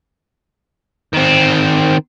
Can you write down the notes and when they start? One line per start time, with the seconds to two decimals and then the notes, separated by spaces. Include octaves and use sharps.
1.14 D#3 C4